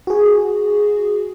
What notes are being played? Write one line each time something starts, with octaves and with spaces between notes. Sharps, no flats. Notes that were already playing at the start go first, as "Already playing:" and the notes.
F#4 G#4